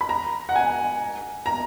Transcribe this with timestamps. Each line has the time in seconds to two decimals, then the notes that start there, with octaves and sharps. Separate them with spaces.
0.01 B5
0.09 A#5
0.49 F#5
0.56 G#5
1.46 A#5